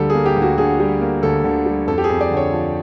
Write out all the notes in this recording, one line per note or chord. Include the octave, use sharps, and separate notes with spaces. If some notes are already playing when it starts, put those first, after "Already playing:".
Already playing: D2 D3 G3 A#3 A4
G#4
A#3
G4
D2
F#4
D3 G#4
G3
A#3
D2 A4
D3
G3
F2 A4
G4
G#4
F2
D5
D3
C#5
F3